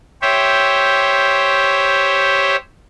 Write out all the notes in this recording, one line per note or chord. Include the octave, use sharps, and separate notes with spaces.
G4 C5 C#5 E5